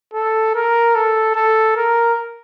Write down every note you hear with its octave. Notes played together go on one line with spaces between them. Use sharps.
A4
A#4
A4
A4
A#4